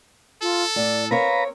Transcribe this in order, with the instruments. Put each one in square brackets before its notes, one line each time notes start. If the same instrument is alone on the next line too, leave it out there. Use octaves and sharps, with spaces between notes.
[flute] F4 [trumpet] A4
[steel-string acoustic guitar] A2 [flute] D5
[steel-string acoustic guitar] C4 A#4 C#5 [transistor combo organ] B4 A#5 [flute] F5